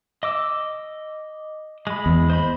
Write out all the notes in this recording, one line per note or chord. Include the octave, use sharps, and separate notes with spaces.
D#5 D6 E6
G#3 B5
E2
C5 D#5 B5